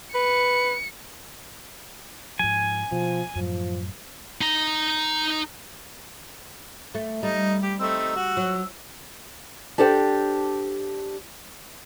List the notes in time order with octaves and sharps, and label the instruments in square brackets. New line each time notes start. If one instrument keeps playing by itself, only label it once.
[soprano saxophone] B4 [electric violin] C#7
[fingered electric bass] G#2 F3 [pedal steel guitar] G#5
[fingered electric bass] B2 [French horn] F3
[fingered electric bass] F#2 A2 [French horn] F3
[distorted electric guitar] D#4 A#5
[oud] A3
[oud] G3 [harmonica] D#4
[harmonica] G4
[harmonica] A3 C4 D#4 [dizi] E6
[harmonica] F#4
[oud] F#3
[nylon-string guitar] D4 G4 A4 C5 E5 G5